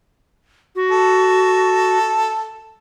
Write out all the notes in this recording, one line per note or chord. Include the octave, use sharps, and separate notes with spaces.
F#4
A4